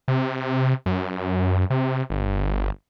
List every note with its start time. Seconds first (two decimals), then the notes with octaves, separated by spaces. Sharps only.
0.08 C3
0.86 F#2
1.70 C3
2.10 G1